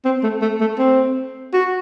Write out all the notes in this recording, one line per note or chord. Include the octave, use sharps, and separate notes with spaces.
C4
A3
A3
A3
C4
F#4